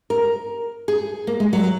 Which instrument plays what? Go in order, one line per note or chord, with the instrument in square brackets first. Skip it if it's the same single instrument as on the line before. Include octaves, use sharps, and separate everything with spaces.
[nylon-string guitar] A#4
G#4
A#3
G#3
F#3